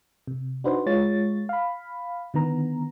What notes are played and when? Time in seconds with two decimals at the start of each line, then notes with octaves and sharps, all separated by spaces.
0.27 C3
0.64 D4 D#4 F#4 B4 C5
0.86 G#3 F4 C#5 A6
1.49 F5 B5
2.34 D3 D#3 B3 A#5